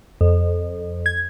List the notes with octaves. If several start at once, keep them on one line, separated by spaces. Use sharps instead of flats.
F2
G#6